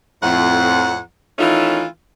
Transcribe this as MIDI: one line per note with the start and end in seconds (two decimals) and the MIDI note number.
0.23 0.99 41
0.23 0.99 45
0.23 0.99 78
1.39 1.84 51
1.39 1.84 52
1.39 1.84 57
1.39 1.84 61
1.39 1.84 63
1.39 1.84 65